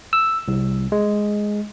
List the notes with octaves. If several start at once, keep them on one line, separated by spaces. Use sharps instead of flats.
E6
C2
G#3